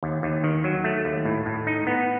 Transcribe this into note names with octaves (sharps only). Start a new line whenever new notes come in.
D#2
D#2
D#3
F#3
A3
D#2
A2
A2
D#4
B3